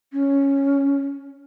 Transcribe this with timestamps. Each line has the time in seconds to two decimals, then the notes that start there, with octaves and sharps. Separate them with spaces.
0.12 C#4